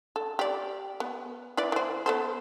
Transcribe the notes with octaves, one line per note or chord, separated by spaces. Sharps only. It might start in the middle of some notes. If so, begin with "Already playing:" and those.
A4
G4 D5
B3
E4 B4 D5
E3 C5
B3 A4 C5